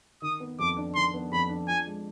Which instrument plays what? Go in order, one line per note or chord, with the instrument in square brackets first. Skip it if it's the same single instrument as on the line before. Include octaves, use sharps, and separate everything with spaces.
[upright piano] D#3 [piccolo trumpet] D#6
[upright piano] B3
[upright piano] F2 [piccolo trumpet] D6
[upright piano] D4
[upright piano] D#3 [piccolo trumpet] C6
[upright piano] B3
[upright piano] F2 [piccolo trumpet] B5
[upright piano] D4
[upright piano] F3 [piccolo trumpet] G#5
[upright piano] G#3